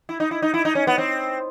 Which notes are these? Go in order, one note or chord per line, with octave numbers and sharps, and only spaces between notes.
E4
D#4
E4
D#4
E4
D#4
C#4
B3
C4